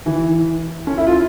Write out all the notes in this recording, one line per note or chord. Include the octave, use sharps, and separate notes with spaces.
E3
C#4
E4
F4